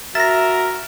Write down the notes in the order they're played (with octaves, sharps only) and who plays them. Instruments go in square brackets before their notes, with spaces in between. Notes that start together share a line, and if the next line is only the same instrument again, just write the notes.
[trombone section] F#4 [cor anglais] A#4 [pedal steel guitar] E5 [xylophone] A6 A#6